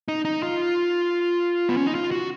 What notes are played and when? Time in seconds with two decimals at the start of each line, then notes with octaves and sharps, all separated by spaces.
0.08 D#4
0.25 D#4
0.43 F4
1.69 B3
1.77 C#4
1.87 D#4
1.95 F4
2.11 F#4